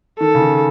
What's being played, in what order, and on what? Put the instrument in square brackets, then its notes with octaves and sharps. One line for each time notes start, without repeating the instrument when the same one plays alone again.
[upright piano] D#3 [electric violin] A4
[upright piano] C#3
D#3